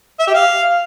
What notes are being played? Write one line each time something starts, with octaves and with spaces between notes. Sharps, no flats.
E5
G4
F5